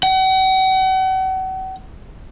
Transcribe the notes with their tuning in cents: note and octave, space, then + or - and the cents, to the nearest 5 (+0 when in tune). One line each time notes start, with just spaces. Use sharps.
F#5 +40